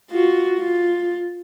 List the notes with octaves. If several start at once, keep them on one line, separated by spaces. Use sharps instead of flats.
F4 F#4
F4